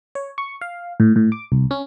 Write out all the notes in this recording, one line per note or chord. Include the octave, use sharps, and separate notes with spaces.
C#5
C#6
F5
A2
A2
D6
C2
C#4